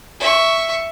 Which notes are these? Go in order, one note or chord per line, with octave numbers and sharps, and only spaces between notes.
E5 C#6